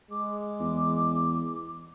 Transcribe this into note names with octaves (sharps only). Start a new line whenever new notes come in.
G#3 D6
E2